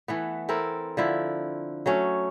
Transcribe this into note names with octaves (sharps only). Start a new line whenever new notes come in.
E3 A3 B3
C4 E4 A4 A#4
D3 F3 E4
F#3 A3 C#4